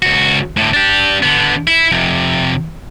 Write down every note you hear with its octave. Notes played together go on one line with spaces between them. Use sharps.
C#2 F#4
A2 D3
D4 G4
D3 B3
E4
F2 C3